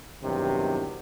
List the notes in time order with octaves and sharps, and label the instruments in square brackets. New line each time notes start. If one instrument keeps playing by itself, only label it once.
[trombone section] E2 G2 C3 D#3 F#3